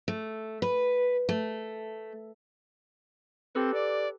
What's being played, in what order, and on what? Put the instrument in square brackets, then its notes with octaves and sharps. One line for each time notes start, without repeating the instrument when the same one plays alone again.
[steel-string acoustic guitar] A3
B4
A3
[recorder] C4 [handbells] G4 A4 B4
[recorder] D5